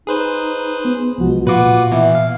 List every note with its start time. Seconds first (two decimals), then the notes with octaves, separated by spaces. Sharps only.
0.07 D#4 G#4 B4 C5
0.85 B3
1.18 C2 F3 G#3 F#4
1.47 A#2 F4 F#4 B4 F#5 D6
1.92 B2 E3 E5
2.15 F5